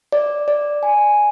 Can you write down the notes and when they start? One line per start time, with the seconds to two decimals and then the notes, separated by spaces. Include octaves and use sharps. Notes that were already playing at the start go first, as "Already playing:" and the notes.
0.12 D5
0.48 D5
0.83 G#5